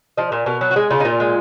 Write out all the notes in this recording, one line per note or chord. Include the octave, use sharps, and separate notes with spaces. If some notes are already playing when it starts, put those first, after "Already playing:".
F3 D#5
A#2
B2 A#4
F#3
F#4
G#3 G#4
C#3 F4
D#4
A#2 F4
G#3